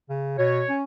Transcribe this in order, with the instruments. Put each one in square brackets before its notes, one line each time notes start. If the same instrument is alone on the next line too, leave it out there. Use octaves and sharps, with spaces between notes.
[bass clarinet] C#3
[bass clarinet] B2 [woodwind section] C#5
[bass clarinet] C#4